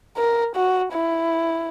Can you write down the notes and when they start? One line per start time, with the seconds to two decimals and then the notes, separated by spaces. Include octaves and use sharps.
0.17 A#4
0.56 F#4
0.93 E4